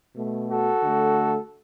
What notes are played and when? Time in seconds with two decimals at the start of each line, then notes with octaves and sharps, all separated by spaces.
0.15 B2 A3
0.49 F#4 A4
0.83 D3 A3